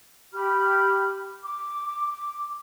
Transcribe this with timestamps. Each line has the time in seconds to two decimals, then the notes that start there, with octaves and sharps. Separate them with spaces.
0.33 G4 B5 F6
1.44 D6